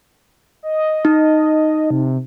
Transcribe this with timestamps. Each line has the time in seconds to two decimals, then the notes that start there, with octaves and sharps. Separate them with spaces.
0.63 D#5
1.05 D#4
1.90 C3